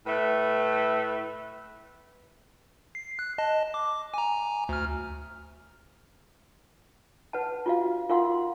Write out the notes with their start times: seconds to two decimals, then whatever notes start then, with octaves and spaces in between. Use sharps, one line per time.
0.07 A2 A3 B4
2.95 C7
3.19 F#6
3.38 D#5 A5
3.74 D6
4.14 G#5 A#5
4.69 D2 F6
7.33 B4 F#5 A5
7.66 F4 F#4 F5
8.09 F4 A#4 F5 F#5 C6
8.31 C6